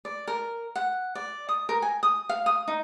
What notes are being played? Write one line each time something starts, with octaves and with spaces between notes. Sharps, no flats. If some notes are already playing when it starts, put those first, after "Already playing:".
D5
A#4
F#5
D5
D#6
A#4
G#5
D#6
F5
D#6
D#4